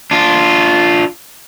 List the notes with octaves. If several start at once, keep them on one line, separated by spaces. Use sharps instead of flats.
D4 F4